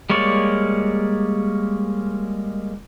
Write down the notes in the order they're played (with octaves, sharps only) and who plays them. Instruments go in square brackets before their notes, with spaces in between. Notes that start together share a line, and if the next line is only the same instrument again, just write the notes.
[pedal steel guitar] G3 G#3 A#3 C#5 D5